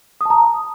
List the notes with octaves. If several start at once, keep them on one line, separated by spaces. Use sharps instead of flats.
A5 A#5 D#6